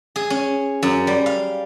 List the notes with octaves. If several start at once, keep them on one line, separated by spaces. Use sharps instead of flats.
G#4
C#4
F#2
G3
F5